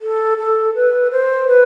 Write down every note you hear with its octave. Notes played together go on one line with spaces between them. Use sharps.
A4
A4
B4
C5
B4